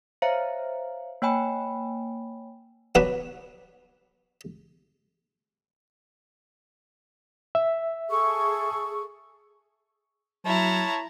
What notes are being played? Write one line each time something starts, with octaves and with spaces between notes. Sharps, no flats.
C5 C#5 E5 F5 A#5
A#3 C#5 G5 G#5 B5
F#3 B3 D4 F#4 B4
E5
G#4 A4 C#6
F#3 E4 C#5 A5 A#5